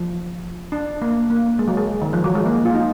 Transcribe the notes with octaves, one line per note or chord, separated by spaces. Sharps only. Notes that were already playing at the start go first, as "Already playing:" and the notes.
Already playing: F3
D4
A#3
A#3
G#3
F#3
G#3
D#3
F3
F#3
G#3
A#3
F4
D#4